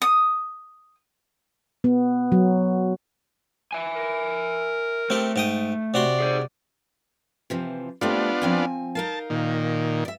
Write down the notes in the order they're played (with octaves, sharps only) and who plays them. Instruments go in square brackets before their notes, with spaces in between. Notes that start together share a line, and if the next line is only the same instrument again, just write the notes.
[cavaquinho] D#6
[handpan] B3
F#3
[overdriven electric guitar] E5 G#5
[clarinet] A#4
[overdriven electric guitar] A3 [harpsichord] C4 G4
[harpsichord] G#2 G5 D#6
[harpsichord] C3 F#4 C6 [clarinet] D5
[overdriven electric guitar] G#4 C5
[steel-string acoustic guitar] C3 E3 F3
[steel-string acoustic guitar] G3 A3 C4 [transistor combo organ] B3 D4 F4
[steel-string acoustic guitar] F3 C4 G#5
[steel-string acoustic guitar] D#4 A#4 F5 [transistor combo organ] A5
[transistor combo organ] A#2 D#3
[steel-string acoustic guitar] D5 E5